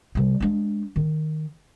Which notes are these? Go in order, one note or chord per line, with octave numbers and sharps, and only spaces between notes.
C3 G3
G#3 D4
D#3